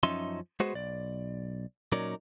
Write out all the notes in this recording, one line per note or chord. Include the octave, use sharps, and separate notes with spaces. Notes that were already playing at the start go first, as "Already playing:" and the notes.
F#2 F3 C#4 D#4 E5 C6
G#3 B3 F#4 G#4 C5
B1 D5
A#2 F#3 C#4 D#4 A#4 D5